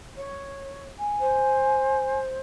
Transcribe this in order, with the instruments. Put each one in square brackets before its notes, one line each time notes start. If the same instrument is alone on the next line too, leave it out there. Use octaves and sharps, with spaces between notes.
[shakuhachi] C#5
[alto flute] G#5
[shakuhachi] C5